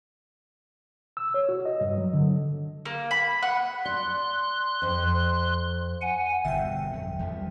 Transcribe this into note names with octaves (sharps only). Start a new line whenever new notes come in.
E6
C#5
F#4
D#5
G2
F#3
D3
A#3
B5
F#5
D5 C6 F#6
F2
F#5 G#5
G1 E2 B2 E5 G5
F2
E2 F3 G3